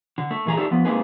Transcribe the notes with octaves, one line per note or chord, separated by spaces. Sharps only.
D3
A3
A#2 E3 G#4 A#5
A3 D4 D#4 G4 A4
F3 B3
G#3 A#3 C4 D#4 G#4 B4